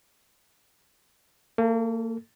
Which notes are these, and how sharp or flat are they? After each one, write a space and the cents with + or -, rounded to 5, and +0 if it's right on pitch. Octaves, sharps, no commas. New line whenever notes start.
A#3 -35 A4 +0